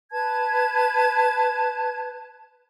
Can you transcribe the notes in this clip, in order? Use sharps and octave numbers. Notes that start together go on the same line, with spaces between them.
B4 A5 G#6